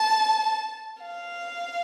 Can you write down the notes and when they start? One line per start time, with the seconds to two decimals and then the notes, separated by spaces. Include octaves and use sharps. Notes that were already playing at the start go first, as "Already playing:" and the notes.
Already playing: A5
1.02 F5